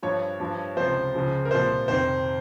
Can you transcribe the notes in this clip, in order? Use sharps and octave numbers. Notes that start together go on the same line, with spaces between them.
G2 F3 C#5
G2 F3
C#2 C3 F3 C5
C#2 C#3 F3
A#4
C2 A#2 F3 C5
F2 C3 D#3 C5